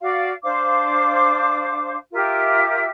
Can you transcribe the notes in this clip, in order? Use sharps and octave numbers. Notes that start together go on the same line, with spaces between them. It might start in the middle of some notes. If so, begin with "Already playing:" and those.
F#4 D5 F5
D4 C5 F5 D6
F4 G4 A#4 E5